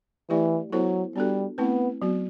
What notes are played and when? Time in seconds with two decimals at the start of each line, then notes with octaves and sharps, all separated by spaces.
0.30 E3 A3 E4 G4 D5
0.72 F#3 B3 E4 A4 C5
1.16 G3 B3 D4 F#4 A4
1.58 A3 B3 C4 E4 B4
2.02 F#3 B3 F#4